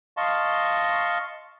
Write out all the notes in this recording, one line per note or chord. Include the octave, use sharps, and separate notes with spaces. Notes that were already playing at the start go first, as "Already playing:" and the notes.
D#5 F5 A5 C6 C#6